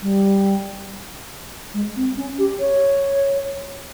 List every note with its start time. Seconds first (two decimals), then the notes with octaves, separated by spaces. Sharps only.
0.02 G3
1.74 G#3
1.96 C4
2.17 C#4
2.39 G4
2.60 C#5